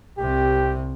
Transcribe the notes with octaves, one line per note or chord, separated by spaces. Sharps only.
C2 C3 G4